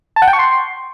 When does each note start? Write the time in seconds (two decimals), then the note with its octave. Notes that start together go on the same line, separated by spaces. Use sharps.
0.16 A5
0.22 F#5
0.28 G5
0.33 C#6
0.39 C6